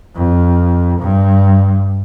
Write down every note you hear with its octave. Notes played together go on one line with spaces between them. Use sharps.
F2
G2